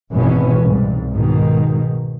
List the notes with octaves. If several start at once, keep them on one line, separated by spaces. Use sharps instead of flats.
G#1 B2 E3 B3 C#4
C2 G#2
G#2 B2 D#3